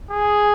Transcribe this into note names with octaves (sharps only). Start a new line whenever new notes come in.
G#4